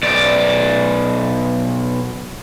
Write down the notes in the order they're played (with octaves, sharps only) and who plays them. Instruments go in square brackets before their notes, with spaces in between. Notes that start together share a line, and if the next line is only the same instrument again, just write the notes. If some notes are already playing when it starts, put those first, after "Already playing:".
[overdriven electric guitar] B1 D5